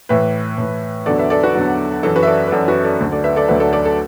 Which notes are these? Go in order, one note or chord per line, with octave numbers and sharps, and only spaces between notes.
A2 E3 B4 E5
A2 E3
E2 D3 F#3 A4 D5
B4 E5
A4 D5
F#4 B4
E2 D3 F#3
F#2 E3 A4
F#4 B4
E5
A4 D5
B4
F#2 E3 A4 D5
F#4 B4
A4 D5
D2 D3 F#3
A4 D5
B4 E5
A4 D5
D2 D3 F#3 B4 E5
A4 D5
A4 D5
A4